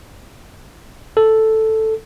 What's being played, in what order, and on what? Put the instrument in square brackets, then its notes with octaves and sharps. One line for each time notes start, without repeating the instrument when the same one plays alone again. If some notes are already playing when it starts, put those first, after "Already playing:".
[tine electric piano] A4